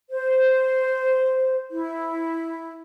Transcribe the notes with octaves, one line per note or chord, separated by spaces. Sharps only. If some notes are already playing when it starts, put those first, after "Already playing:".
C5
E4